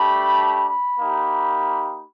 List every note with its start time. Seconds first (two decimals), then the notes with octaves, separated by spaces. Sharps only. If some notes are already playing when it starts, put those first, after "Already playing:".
Already playing: A3 D4 G4 B5
0.67 B5
1.00 A#3 D#4 G4